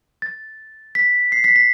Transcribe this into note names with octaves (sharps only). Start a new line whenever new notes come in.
A6
B6
C7
B6
B6